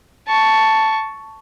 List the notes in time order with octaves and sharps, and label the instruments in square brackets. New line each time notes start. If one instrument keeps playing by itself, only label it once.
[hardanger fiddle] A5 C#6